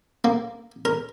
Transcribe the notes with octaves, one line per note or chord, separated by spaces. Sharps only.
A#3
A#4